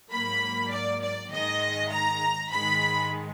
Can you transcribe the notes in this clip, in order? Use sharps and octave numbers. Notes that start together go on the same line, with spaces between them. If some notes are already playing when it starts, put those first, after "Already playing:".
G#2 F#3 A#3 B5
D5
D5
G#2 D#3 G#3 D#5
A#5
G#2 D#3 G#3 B5